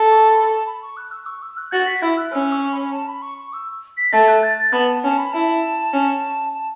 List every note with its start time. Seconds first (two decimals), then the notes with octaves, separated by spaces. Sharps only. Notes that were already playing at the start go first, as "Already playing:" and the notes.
Already playing: A4
0.11 C#6
0.31 B5
0.51 A5
0.66 B5
0.82 C#6
0.97 F#6
1.11 E6
1.26 C#6
1.42 E6
1.57 F#6
1.72 F#4 A6
1.86 B6
2.02 E4 E6
2.18 F#6
2.32 C#4 E6
2.52 C#6
2.73 B5
2.92 A5
3.07 B5
3.22 C#6
3.38 C#6
3.53 E6
3.97 B6
4.12 A3 A6
4.28 F#6
4.43 A6
4.58 A6
4.72 B3 A5
4.88 A5
5.03 C#4 A5
5.18 B5
5.32 E4 A5
5.93 C#4
6.53 A5